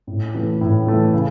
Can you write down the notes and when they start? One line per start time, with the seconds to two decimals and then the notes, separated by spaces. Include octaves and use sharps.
0.07 A2
0.35 E3 A3
0.61 A2
0.87 E3 A3
1.14 C#3